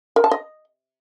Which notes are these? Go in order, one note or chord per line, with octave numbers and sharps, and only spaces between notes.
A#4
A5
D#5